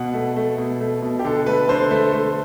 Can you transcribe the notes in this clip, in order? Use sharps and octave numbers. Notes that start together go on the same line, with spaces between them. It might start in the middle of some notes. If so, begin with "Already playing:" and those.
Already playing: B2 F#5
A3
A3
B2
A3
B2
G4
D3 A4
A3 B4
D3 C5
A3
A3